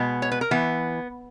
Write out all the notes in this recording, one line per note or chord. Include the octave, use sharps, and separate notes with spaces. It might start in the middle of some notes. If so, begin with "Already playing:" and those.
Already playing: B2 G#3 B3
C#5
B4
A#4
E3 B3